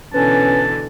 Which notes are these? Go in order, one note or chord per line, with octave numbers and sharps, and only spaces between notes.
B2 D3 E3 C#4 B4 A5